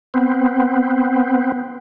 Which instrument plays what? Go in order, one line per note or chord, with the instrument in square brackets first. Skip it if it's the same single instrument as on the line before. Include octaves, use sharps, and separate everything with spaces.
[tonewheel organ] B3 C4